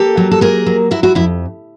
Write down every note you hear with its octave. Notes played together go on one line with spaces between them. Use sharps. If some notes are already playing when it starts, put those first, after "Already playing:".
Already playing: A#3 G4 A4
F#3
A4
A#3 G#4 A#4
F#3
F#3 E4 F#4
E4 F#4
F2 E4